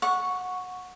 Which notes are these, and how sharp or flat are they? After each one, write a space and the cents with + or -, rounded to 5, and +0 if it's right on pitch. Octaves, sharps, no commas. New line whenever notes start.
F#5 -20 C#6 +0